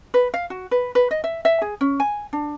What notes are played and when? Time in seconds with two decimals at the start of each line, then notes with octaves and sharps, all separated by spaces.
0.14 B4
0.34 F5
0.50 F#4
0.71 B4
0.95 B4
1.11 D#5
1.24 E5
1.45 E5
1.62 G#4
1.81 C#4
2.00 G#5
2.33 D4